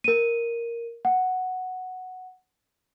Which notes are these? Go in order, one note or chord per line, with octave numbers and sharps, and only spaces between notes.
A#4 D#7
F#5